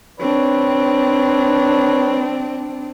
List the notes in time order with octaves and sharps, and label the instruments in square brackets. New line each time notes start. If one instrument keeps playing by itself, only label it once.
[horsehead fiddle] C4 D4 [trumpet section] B4 C#5